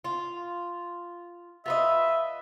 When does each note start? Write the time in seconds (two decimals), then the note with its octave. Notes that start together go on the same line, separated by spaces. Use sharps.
0.04 F4
1.66 F4 B4 D#5 E5